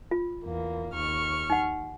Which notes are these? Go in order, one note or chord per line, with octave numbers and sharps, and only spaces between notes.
F4
E2 A#3
D#2 C#6 F6
D#4 F#5